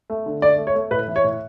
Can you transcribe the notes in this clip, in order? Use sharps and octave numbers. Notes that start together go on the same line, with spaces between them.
A3
D3
A3 D5
A3
C#5
A3
A2 B4
E3
C#5
A2